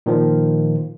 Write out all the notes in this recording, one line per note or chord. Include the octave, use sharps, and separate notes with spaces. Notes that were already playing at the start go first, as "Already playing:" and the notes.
A#2 D#3 F3